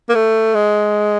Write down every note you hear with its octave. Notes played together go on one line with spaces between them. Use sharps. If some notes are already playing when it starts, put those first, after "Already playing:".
A#3
A3
G#3